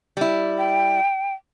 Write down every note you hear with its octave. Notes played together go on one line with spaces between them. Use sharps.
G3 E4
G5